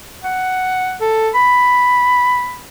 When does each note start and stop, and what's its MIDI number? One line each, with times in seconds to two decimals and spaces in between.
0.23 0.95 78
1.01 1.29 69
1.34 2.60 83